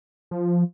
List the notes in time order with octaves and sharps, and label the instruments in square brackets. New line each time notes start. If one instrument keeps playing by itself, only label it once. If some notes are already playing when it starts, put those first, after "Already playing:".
[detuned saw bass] F3